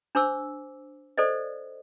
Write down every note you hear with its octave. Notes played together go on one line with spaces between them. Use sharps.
D4 C5 D6 E6
A4 C5 D5 D#5